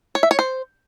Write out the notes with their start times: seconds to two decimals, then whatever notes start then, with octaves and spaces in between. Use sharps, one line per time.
0.15 C#5
0.23 E5
0.31 C#5
0.39 C5